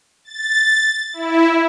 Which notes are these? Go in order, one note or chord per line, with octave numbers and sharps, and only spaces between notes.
A6
E4